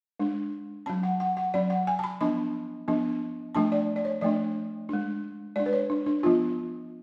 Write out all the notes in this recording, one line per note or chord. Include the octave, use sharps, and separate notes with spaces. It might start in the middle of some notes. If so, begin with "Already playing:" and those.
G#3 D4
F#3 C#4 A5
F#5
F#5
F#5
F#3 C#4 D5
F#5
G#5
A5
B5
F3 B3 D4 B5
F3 B3 D4
F3 A3 D4 A5
D5
D5
C#5
F3 A3 D4 D5
G#3 D4
G#3 D4 D5
B4
C#5
D4
D4
F3 B3 D4 F4